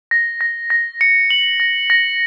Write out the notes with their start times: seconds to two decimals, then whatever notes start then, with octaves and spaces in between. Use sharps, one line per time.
0.11 A#6
0.41 A#6
0.70 A#6
1.01 C#7
1.30 F#7
1.60 A#6
1.90 A#6